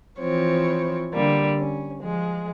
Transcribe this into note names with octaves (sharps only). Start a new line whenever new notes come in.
E3 F3 C4 C#5
D3 G3 A#3
C#4
F3 G#3